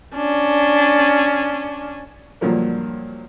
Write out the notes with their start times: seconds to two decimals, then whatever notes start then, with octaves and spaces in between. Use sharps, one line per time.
0.16 C#4 D4
2.41 G2 A#2 D3 F3 F#3 A#3